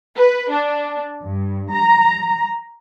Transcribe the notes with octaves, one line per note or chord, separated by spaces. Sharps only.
B4
D4
G2
A#5